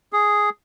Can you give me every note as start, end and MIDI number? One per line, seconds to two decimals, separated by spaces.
0.13 0.50 68